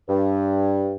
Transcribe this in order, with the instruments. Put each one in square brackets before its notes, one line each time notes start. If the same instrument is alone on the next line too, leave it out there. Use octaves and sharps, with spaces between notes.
[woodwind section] G2